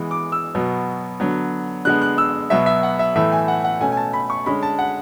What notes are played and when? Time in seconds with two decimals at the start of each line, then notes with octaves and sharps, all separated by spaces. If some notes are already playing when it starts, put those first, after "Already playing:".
Already playing: E3 G#3 B3
0.11 D6
0.32 E6
0.55 B2 F#3 B3
1.20 D3 F#3 B3
1.85 D3 G#3 B3 F#6
2.02 F#6
2.18 E6
2.50 B2 F#3 B3 E5
2.66 E5
2.83 F#5
2.99 E5
3.15 A2 E3 A3 E5
3.32 G#5
3.48 F#5
3.64 F#5
3.80 B2 A3 C#4 G#5
3.92 G#5
3.97 A5
4.14 B5
4.30 C#6
4.46 D3 G#3 C#4 B5
4.63 A5
4.79 F#5